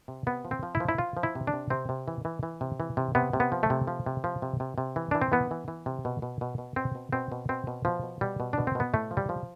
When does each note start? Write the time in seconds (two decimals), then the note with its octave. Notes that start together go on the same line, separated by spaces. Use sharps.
0.08 C3
0.27 C3 B3
0.45 F3
0.51 C4
0.63 F3
0.75 E4
0.80 F3
0.89 E4
0.98 F3 F4
1.17 F3
1.23 E4
1.35 C3
1.47 D4
1.53 C3
1.70 C3 C4
1.89 C3
2.08 E3
2.25 E3
2.43 E3
2.61 C3
2.80 E3
2.97 C3
3.15 C3 B3
3.33 C3
3.40 B3
3.52 F3
3.63 A3
3.70 C3
3.87 F3
4.06 C3
4.24 F3
4.42 C3
4.60 C3
4.78 C3
4.96 E3
5.11 E3 D4
5.22 C4
5.32 E3 B3
5.51 E3
5.68 E3
5.86 C3
6.05 B2
6.22 B2
6.41 B2
6.58 B2
6.76 B2 C4
6.95 B2
7.13 B2 C4
7.32 B2
7.49 B2 C4
7.67 B2
7.85 B2 F3
8.03 B2
8.21 B2 G3
8.40 B2
8.53 B2 D4
8.67 C4
8.75 B2 B3
8.93 A2 A3
9.11 F3
9.17 G3
9.29 F3